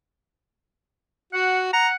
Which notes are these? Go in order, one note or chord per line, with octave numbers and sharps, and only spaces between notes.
F#4 F#5
F#5 A#5